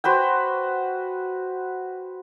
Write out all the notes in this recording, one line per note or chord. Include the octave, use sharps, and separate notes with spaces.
F#4 B4 C5 G5